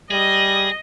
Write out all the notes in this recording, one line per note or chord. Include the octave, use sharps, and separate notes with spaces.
G3 G#4 D#5